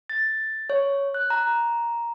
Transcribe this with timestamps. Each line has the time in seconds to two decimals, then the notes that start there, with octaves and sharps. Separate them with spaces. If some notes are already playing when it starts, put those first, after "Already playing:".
0.10 A6
0.70 C#5
1.14 F#6
1.30 A#5